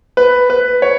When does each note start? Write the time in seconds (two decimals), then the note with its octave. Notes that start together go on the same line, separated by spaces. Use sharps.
0.17 B4
0.50 B4
0.82 C#5